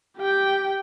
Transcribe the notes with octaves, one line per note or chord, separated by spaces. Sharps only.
G4 G5